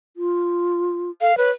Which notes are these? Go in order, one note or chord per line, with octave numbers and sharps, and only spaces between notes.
F4
A4 F5
B4 C#5